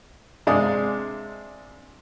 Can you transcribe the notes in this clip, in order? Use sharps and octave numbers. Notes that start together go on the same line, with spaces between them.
C3 G#3 D4 D5 F5 D#6